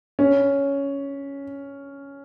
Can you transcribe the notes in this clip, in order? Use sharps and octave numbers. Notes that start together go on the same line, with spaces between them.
C#4